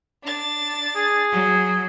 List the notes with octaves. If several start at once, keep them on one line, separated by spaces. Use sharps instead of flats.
D4 A6
G#4
F#3